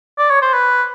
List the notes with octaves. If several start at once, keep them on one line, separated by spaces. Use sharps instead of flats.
D5
C#5
C5
B4